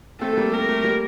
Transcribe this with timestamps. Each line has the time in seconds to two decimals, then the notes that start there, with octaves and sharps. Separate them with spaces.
0.20 A3 C4 A4
0.33 A3
0.37 G3 A#3
0.53 G3 A#4
0.68 A3
0.84 G3 A#3